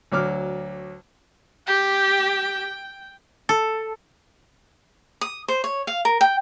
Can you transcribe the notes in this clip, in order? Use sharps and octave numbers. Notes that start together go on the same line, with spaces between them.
D2 F#3 D6 F6
G4 G5
A4
D#6
C5
C#5
F5
A#4
G5